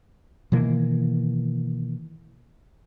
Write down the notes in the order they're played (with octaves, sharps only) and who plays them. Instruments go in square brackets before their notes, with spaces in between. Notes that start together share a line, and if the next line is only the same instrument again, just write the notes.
[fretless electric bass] B2 D#3 E3 A#3